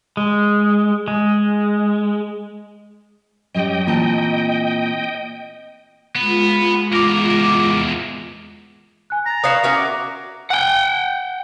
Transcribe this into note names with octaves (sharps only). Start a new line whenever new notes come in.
G#3
G#3
F#2 F#3 G3 D#5 G5
A#2 E3 C4 A5
G#3 B3 F4
E2 A#4 D6
G#5 F#6
A#5 A6 A#6
B4 C#5 F5 D#6 C7 E7
C#4 F#4 A#4 E5
D6
F#5 G5